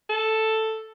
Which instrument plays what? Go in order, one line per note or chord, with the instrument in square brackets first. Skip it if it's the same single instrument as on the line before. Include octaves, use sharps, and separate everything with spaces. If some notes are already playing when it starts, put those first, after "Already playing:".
[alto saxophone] A4